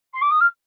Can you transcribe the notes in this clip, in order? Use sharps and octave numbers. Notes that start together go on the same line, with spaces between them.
C6
D6
D#6
F6